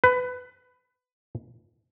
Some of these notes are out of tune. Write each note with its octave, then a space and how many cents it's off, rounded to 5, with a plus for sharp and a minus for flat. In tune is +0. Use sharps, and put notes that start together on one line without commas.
B4 +20